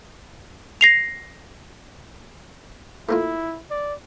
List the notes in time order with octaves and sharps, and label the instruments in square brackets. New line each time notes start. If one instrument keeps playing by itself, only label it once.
[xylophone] A#6 C7 F7
[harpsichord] A3 A#3 F4 [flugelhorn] E4
[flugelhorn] D5